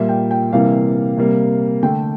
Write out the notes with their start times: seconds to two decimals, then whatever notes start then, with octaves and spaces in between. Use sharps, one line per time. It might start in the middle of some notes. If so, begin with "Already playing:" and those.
Already playing: A#2 G3 A#3 E5
0.09 G5
0.31 G5
0.53 C3 E3 G3 A#3 F5
1.17 C3 G3 A#3
1.83 D3 A3 G5